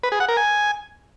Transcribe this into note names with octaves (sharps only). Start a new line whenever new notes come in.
B4
G#4
F#5
A#4
G#5